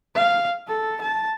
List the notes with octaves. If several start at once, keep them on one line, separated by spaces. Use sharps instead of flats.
F5
A4
A5